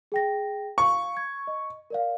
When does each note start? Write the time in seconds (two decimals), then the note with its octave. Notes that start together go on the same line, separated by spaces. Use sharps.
0.12 G#4 G5 A#6
0.78 F5 C#6
1.17 G#6
1.47 D#5
1.90 A#4 D5 F5